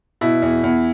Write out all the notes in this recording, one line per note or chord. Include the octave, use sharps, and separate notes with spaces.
B2 E4
E2
E2